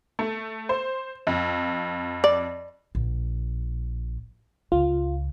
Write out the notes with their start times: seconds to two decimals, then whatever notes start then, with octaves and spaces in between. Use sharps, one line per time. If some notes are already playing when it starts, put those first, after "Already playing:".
0.19 A3
0.69 C5
1.27 F2
2.24 D5
2.95 A#1
4.72 C#2 F4